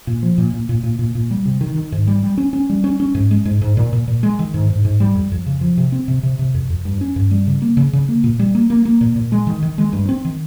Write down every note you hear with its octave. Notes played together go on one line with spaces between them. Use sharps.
A#2
F3
A#2
A#2
A#2
A#2
A#2
A#2
G3
C3
D#3
D#3
G#2
G3
G3
C#4
C#4
G3
C#4
C#4
G#2
G#3
G#2
G#2
A#2
A#2
A#2
G#3
D#3
G#2
G#2
G#2
G3
F2
F2
C#3
F3
C3
C4
C3
C3
C3
F2
F2
G2
C#4
G2
G3
C#3
A#3
C#3
C#3
A#3
A#2
G3
A#3
A#3
A#3
A#2
A#2
G#3
D#3
D#3
G#3
G2
C4
D#3